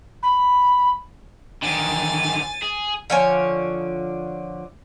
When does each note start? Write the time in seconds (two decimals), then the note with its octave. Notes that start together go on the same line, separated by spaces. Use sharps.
0.23 B5
1.62 D3 D#3 G#5 A6
2.62 G#4
3.10 D3 F3 C#5 F5 G#5